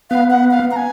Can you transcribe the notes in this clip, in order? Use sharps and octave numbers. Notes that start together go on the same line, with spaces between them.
B3 F5
F#5
F5
A#5
G#5